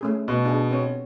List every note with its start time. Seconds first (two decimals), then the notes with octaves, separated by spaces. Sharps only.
0.01 A3 C#4 G#4
0.28 B2
0.45 D4 G#4
0.71 B3 C4 C#5